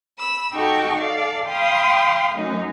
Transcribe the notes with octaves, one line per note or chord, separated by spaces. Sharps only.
B5 E6
D#4 F#4 G4 A4 G5 C#6
A4 D5 F5
F5 G5 B5 C6 D#6
F#2 F#3 A3 C#4 D#4